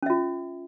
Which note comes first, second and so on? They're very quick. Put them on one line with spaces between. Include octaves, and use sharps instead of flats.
C#4 E5 F4